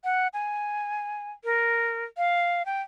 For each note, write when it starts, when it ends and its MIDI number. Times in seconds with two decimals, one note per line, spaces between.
0.04 0.28 78
0.34 1.32 80
1.44 2.05 70
2.17 2.65 77
2.66 2.82 79